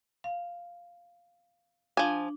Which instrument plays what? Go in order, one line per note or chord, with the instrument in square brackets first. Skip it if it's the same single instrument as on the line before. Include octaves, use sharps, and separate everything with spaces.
[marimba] F5
[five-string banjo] F3 G#5 [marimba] D4